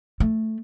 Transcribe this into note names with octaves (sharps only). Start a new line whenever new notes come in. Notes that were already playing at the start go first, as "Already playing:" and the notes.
A3